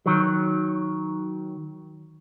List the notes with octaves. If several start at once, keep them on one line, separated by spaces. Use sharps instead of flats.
D#3 F#3